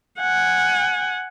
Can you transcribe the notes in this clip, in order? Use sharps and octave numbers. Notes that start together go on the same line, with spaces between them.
F#5 G#5